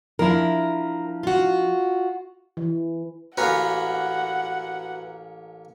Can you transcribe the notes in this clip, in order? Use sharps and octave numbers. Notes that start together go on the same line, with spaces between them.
F3 D4 E4 A#4
F4 F#4
E3
A1 A#3 C#4 F#4 B4 F#5 A#5